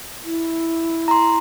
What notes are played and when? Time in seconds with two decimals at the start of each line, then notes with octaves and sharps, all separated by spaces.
0.23 E4
1.08 A#5 C6